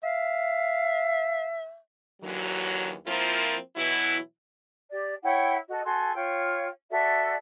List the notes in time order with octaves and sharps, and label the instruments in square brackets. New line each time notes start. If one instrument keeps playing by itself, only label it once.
[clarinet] E5 [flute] F5
[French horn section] D#2 D3 E3 F#3
F3 A#3 C4 E4 F4 A#4
B2 E3 F#3 E4
[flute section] G4 D5
E4 C#5 F#5 G5
F#4 A4 D#5
F#4 A4 G#5 C6
F4 C#5 G5
F#4 A4 D5 E5